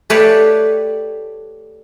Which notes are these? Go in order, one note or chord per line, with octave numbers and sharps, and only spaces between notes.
A3 G4 B4 C#5 D5 F5